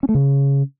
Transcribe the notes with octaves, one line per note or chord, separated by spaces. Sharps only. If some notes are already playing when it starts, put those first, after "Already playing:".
C#4
A3
C#3